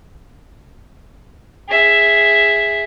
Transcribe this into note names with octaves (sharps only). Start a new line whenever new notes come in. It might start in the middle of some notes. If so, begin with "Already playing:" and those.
G#4 E5